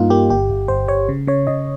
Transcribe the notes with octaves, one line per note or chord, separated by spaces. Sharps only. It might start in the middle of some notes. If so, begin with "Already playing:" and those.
Already playing: G2 G3 A#3 D#4 F4
A#3 G4
G1 G4
G1
G1 C5
G1 C#5
C#3
C#3 C#5
C#3 D#5